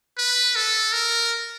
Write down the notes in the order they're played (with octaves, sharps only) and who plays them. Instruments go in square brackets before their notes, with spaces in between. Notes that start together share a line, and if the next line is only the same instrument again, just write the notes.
[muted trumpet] B4
A4
A#4